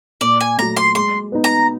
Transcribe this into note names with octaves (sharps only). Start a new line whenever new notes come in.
A#2 D5
G#5
F#3 A3 A#5
C6
G#3 C6
B3 D#4
A#5